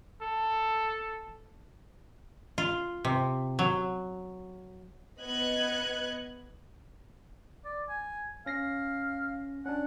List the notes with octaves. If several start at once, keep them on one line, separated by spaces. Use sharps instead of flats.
A4
F4
C3
F#3
B3 B4 D#5 F#6 G#6 C#7
D5
G#5
C#4 F5 A#6 C7
C#4 D4 F#5